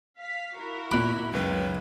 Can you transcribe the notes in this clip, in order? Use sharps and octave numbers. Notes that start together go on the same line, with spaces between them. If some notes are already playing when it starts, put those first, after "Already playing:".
F5 B6
E4 F#4 A#4
A#2 B5 D6 F#6
C#2 F#2 D#3 F#3 B4